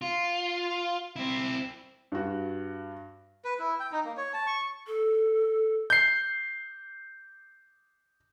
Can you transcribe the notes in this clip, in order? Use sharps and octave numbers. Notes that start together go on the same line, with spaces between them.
F4
C4 E4
G2 F#4
B4
E4
G5
D#4
A#3
C#5
A5
C#6
A4
G6 C7